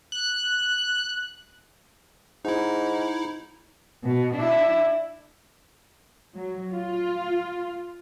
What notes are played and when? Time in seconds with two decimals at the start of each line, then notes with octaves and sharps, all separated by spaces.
0.12 F#6
2.45 G#2 D#4 E4
4.04 B2
4.36 D4 E4
6.36 F#3
6.74 F4